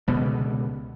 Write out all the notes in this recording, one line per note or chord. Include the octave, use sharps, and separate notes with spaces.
C#2 B2 D3 B3